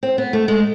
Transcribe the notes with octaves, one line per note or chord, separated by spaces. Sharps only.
C4
B3
A3
G#3